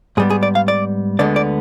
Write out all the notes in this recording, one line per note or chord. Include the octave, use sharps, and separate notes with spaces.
G#2 G3 B3 G#4
G#4
D5
F5
D5
D2 D3 G#3 B3 D5
D5